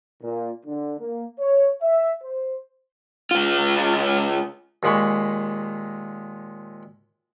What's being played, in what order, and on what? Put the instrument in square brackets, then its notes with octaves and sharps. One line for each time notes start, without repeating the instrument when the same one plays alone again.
[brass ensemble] A#2
D3
A#3
C#5
E5
C5
[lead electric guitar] C#2 F4
[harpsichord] D#2 A#2 G#3 B5 C#6